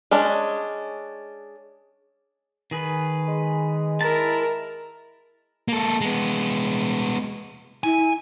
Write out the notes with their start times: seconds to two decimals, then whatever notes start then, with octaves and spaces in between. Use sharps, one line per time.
0.11 G#3 C#4 D4
2.71 D#3 G#4 B4
3.28 G#3
4.01 E4 A#4 A5
5.68 A#3 A4
6.01 G#3 B3
7.84 E4 G#5